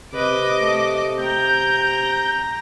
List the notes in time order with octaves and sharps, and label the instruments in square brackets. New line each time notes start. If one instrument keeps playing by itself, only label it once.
[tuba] C3 [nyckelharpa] B4 [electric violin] D#5 D6
[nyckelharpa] A3
[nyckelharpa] G5 A#5 [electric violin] G6